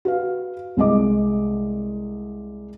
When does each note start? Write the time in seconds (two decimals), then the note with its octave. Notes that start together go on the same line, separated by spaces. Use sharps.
0.05 F#4 B4 F5
0.77 C2 G#3 D#5 D6